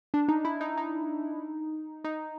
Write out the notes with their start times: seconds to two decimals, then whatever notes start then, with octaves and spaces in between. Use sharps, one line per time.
0.14 D4
0.28 D#4
0.45 E4
0.61 D#4
0.77 D#4
2.04 D#4